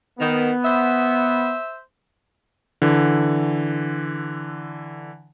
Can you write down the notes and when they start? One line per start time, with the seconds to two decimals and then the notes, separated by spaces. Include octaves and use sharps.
0.20 D#3 B3
0.65 C5 E5
2.82 D3 E3